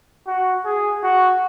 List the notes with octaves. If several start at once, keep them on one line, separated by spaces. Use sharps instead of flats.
F#4
G#4
F#4